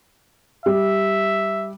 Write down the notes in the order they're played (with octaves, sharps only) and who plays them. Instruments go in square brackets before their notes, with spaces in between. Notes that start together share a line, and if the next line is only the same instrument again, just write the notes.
[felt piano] G3 [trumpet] E5